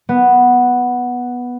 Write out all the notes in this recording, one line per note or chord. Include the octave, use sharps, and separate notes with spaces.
B3